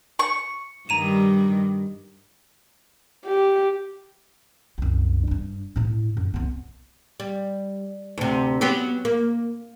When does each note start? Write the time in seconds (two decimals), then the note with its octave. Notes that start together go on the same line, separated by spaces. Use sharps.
0.19 C#6
0.89 G2 D#3 G3 A#5 D#7 E7
3.26 G4
4.78 C2 F#2
5.27 G2 D4
5.76 A2 E4
6.17 F#2
6.34 C2 B3
7.20 G3
8.18 D2 C3
8.61 F#3 B3 G4
9.05 A#3